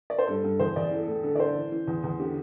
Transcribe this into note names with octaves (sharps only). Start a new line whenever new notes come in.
D5
C5
G2 A4
G2 A4
E2 C5
E2 D5
E3 A4
A2 A4
D3 A4
D5
D3 C5
E3
E3
E2
E2
D3 G4